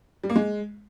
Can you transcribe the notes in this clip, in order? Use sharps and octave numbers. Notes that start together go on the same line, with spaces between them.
G3
A#3
G#3